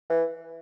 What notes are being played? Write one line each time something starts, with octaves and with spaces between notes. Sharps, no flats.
E3